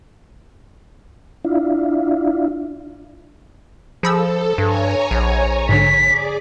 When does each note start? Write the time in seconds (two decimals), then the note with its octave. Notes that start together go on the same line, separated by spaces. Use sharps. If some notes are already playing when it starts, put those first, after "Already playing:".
1.44 D4 E4 F4
4.03 F3 G#4 A4 B5 E6
4.58 G2 C#5 G#5 A#5
5.11 A#1
5.69 G#2 D3 B6
6.06 G#4 D5 D6